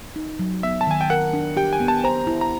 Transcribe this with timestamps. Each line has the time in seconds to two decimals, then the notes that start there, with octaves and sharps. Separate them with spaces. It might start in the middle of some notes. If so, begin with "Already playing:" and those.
0.16 D#4
0.39 F#3
0.63 B3 E5
0.81 A5
0.87 D#3 G#5
1.01 G5
1.10 A#4 F#5
1.33 D4
1.57 G4 G5
1.73 G#5
1.80 B3
1.88 A5
2.04 C5 A#5
2.27 E4
2.41 A#5